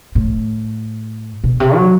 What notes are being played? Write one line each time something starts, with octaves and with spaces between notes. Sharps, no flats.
A2
B2
C3
F#3